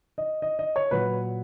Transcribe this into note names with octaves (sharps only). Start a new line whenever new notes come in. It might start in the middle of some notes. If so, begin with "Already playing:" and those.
D#5
D#5
D#5
C#5
A#2 F#3 B4